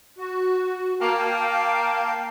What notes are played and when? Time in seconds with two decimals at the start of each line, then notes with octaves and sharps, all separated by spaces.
0.18 F#4
1.00 A#3 F5 G5 A5